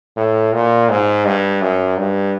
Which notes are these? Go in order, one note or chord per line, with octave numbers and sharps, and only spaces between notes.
A2
A#2
G#2
G2
F#2
G2